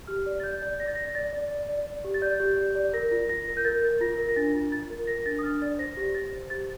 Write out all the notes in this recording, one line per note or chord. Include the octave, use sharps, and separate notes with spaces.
G4 F6
D5
A6
D5 G6
D5
D5 A#6
A6
D5 A#6
D5 A6
D5
D5
D5
D5
G4
A6
D5 G6
G4
G4
D5
A#4 A#6
F4
F4 A#6
A#4
G6
A#4 A6
A#4
F4 A#6
A#4
A#6
D4 A6
F4
F4 A6
A#4
A#4 A#6
D4 A6
D#6
D4 F6
D5 A6
C5 A#6
G4 A#6
C5 A6
C5
G4 A6